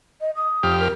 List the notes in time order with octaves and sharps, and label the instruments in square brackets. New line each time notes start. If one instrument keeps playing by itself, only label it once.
[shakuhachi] D#5
D#6
[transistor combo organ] F2 G4 F6
[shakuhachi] A#4